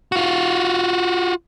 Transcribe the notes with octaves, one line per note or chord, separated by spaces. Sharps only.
F4 F#4